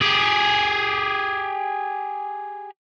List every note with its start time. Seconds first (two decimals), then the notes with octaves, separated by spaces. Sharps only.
0.01 G4 G#4